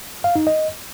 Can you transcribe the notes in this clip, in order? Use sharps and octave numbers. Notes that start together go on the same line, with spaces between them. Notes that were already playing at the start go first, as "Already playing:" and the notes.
F5
D#4
D#5